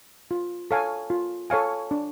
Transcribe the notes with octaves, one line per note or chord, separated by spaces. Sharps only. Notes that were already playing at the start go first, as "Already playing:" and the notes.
F4
A4 C#5 F5 G#5
F4
A4 C#5 F5 G#5
D4